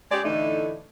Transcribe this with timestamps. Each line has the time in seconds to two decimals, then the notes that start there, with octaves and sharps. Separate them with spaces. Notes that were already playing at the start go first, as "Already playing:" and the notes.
0.11 G#3 C#4 G4 D5
0.25 A2 D3 E3 A3 D#4